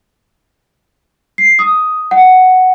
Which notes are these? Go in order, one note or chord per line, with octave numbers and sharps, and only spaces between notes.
C7
D#6
F#5